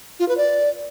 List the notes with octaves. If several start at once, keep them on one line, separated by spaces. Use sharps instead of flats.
F4
B4
D5